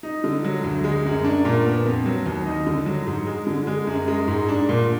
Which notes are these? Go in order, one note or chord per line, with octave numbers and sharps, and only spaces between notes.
D#4
D3
F#3
D2
G#3
F#2
D4
A#2
B3
F2
F#3
D#2
D#4
D3
F#3
G#2
G#3
D3
G#3
F#2
G#3
G#2
D4
A#2